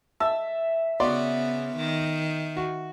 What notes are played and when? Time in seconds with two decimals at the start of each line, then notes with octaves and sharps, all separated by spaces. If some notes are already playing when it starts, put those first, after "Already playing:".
0.20 E5 A5
1.00 C#3 B3 F#4 D5 C6
1.77 D#3
2.57 F#4